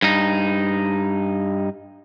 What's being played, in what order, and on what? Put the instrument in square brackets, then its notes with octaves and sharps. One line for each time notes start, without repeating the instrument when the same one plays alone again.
[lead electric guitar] G2 D#4